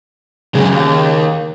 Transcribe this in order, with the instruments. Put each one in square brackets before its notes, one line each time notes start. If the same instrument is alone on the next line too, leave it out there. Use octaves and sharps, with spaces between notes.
[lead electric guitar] F#2 G#3 [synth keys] C#3
[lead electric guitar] D#2